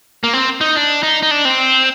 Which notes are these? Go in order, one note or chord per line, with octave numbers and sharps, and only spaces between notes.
A#3
C4
D#4
D4
D#4
D#4
D4
C4